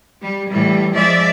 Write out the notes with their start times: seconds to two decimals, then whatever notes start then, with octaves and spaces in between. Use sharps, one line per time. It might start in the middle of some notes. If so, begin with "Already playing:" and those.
0.20 G3
0.49 A2 E3 G3
0.94 F3 G#3 D5 E5